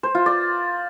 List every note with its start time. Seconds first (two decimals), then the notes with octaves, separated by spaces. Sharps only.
0.03 C5
0.15 F4
0.26 D5